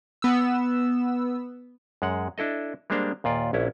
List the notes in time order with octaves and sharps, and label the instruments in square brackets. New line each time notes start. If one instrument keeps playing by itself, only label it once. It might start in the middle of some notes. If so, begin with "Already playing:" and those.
[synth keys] B3 E6
[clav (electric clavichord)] F#2 G#3 F#5
D4 E4 A4 D#5
G3 G#3 A#3 D4 C5 F5
D#2 A#2 F4 D5
A#1 C#4 E4